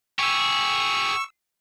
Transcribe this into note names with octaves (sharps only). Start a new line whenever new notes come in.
G4 G#4 C#6 E6